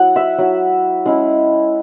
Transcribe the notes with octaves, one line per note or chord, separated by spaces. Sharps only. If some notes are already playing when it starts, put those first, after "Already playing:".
Already playing: F#3 E4 F#5
E5
F#3 E4
G#3 C#4 E4